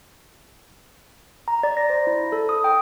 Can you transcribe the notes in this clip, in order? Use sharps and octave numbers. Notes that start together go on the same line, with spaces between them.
A#5
D5
A#6
C5
E4
A4
D#6
G5